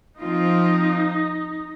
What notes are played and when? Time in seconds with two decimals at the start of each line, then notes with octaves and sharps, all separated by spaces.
0.20 F3 C4 D#4 F4